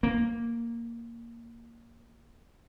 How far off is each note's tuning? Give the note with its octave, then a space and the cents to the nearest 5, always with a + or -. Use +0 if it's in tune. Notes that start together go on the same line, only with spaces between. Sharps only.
A#3 -5